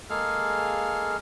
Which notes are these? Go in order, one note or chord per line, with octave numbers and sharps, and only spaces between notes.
G#3 A#3 G#4 A4 F5 F6